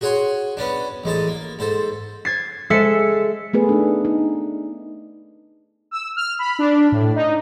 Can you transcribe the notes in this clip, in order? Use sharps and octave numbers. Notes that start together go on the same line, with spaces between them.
F#4 G#4 C#5 F#5 C6
B3 C#4 D4
A1 G#3 D#4 A5
A#3
G#2 A4 C5
G#6 A6 C7
G#3 A4 E5 C7 C#7
A3 B3 G#4 B4
D4 D#4
D#4
E6
F6
B5
D4
A2
D#4